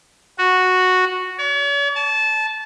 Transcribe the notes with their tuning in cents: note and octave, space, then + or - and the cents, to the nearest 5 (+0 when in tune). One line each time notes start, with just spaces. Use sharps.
F#4 -5
C#5 +45
A5 -20